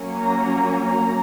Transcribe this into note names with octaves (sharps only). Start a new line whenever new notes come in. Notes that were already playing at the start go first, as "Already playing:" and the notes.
Already playing: F#3 A#3 C#4
A#5
A#5